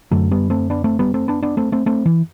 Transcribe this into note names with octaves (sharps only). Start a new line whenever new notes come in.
F#2 D3 F#3 A3
G3 B3
A3 C4
B3 D4
A3 C4
G3 B3
A3 C4
B3 D4
B3 D4
A3 C4
A3 C4
A3 C4
E3